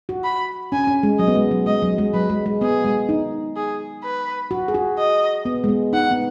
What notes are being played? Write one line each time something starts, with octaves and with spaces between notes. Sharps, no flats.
F#4
B5
C#4 G#5
C#4
G#3
F#3 D#5
B3
G#3
F#3
G#3 D#5
F#3
G#3
F#3 B4
G#3
G#3
B3 G#4
G#3
D#4
G#4
B4
F#4
G#4
F#4
D#5
B3
G#3
B3
D#4 F#5
B3